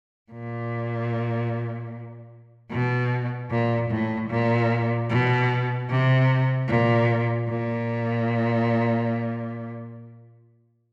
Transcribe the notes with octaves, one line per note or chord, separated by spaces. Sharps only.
A#2
B2
A#2
A2
A#2
B2
C3
A#2
A#2